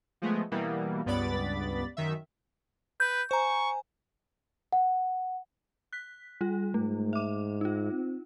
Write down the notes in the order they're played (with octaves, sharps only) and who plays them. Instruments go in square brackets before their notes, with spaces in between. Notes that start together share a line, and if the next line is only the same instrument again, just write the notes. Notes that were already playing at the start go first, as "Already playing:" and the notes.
[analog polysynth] F3 G#3 A3 B3
B2 E3 G3 A#3 B3
C#2 G2 B3 D5 B5 A6
F#2 D#3 E5
[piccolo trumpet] B4 [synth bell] G6
[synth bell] C5 A#5 [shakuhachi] G#5 [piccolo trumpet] C#6
[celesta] F#5
[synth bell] F#6 B6
G3 F4
[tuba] G#2 [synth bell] A3
[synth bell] E5 D6
D#4 F4
[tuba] C4